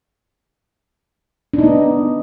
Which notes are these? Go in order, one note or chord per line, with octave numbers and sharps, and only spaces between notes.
B3 D4 D#4